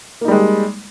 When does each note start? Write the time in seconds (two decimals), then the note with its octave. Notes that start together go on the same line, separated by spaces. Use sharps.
0.21 A#3
0.25 D#4
0.28 G3
0.31 G#3